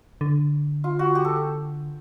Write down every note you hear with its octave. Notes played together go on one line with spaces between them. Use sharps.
D3
F4
F#4
G4
A4